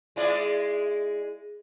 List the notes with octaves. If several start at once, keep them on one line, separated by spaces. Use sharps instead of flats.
G#3 E4 D5